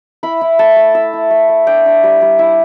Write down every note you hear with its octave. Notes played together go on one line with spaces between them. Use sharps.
E4 B5
E4
A3 A5
A3
E4 E5
E4
A3
A3
D4 G5
D4
G3
G3
E4